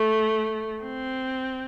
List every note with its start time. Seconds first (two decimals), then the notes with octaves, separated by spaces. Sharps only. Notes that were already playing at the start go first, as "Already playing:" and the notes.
Already playing: A3
0.83 C4